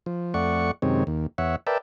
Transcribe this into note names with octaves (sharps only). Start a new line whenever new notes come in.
F3
F2 A3 D5 F#5 C#6
F#2 C3 D#3 G#3 C4 C#5
D#2
E2 C#5 E5 F#5
A#4 B4 D5 E5 G5 A5